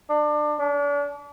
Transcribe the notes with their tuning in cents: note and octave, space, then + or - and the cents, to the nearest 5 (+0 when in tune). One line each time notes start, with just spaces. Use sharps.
D4 +25
D4 -35